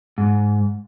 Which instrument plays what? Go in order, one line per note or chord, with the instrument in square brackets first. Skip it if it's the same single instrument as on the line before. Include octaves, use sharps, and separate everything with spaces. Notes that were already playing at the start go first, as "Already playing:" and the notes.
[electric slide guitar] G#2